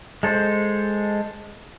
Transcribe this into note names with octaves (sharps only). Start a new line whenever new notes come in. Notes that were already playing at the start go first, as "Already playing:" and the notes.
G#3 A4 C5